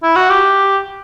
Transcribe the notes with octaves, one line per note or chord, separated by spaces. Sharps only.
E4
F#4
G4